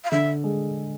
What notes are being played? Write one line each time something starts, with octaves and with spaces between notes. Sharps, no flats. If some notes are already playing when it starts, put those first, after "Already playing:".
F5
D3 E5
G#3